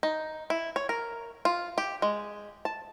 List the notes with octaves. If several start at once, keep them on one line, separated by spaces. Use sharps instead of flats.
D#4
E4
C#5
A#4
F4
G4
G#3
A5